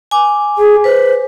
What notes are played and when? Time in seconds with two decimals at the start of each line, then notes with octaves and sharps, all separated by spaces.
0.11 G#5 D6
0.58 G#4
0.84 B4 C5